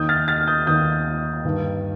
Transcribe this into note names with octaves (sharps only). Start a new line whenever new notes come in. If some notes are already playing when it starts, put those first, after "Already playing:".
Already playing: D#2 D#3 D#6 G6
F6 A6
F6 A6
F6
D#6 G6
D#2 D#3 D#6 G6
G2 D#3